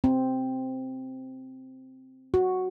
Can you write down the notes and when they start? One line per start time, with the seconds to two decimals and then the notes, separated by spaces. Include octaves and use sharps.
0.04 C4
2.34 F#4